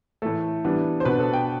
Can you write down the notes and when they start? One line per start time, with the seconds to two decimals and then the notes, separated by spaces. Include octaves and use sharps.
0.22 A2 E3 A3 A4
0.64 E3 G3 B3 D4
1.00 C5
1.05 B2 B3 D4 B4
1.20 A4
1.33 G5